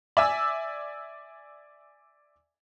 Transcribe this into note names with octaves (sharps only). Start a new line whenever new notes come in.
D5 E5 G#5 E6